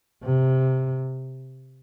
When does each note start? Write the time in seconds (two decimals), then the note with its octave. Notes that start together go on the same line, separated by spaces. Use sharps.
0.23 C3